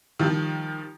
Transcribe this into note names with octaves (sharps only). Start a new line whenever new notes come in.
D#3 F3 G3